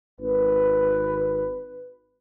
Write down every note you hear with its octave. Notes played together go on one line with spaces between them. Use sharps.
G#1 B4